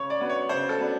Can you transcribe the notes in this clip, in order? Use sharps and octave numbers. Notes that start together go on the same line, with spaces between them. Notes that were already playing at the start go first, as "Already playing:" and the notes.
Already playing: C#3 C#5
D5
F#3 B3 D4
C#5
C#3 C5
A4
F#3 B3 D4